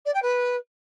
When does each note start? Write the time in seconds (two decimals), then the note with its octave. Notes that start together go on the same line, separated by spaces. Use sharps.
0.05 D5
0.14 G5
0.22 B4